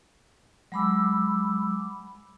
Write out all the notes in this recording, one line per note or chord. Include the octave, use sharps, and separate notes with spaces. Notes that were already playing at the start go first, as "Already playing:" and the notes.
F#3 G#3 B5 D6 E6